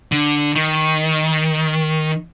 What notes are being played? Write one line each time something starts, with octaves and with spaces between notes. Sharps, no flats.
D3
D#3